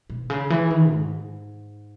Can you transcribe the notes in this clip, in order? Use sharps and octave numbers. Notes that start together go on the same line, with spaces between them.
B2
C#3
E3
D#3
G#2